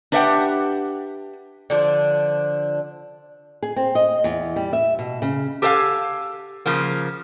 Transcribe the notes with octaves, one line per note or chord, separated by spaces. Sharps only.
D4 G4 B4 E5 F#5 G5
D3 F3 D4
G#4
C4
D#5
E2
G3
E5
B2
C#3
G4 A4 B4 E5 F5 G#5
C#3 F3 A#3